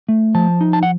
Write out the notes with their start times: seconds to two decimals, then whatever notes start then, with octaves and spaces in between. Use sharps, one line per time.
0.09 A3
0.35 F3 A5
0.61 D#4
0.73 A5
0.83 F#5